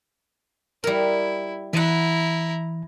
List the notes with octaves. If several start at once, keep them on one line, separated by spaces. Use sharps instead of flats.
G3 E4 A#4
E3 E4 E5 F#5 A#5